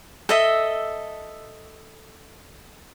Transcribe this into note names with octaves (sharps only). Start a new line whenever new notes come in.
A4 D#5 E5